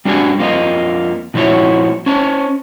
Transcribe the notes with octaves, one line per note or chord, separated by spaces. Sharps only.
G3 D4 F#4 G#4 G#5
F2 F3 A#3 F4 D#5
A#2 F3 E4 F#4 C#5
C#4 C5 A5